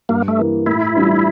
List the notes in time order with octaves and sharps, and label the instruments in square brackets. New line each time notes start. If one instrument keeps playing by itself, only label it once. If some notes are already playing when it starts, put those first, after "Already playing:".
[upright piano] G2 [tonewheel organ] A#3
[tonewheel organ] A3
[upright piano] E3 A#3
[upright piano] A2 [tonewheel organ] E4
[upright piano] E3 G3 D4 F4